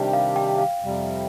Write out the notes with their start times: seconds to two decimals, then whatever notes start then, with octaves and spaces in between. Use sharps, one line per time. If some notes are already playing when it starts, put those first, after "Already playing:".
Already playing: C3 D#3 G3 D4 G4 G5
0.13 F5
0.36 G5
0.58 F5
0.82 F2 C3 G3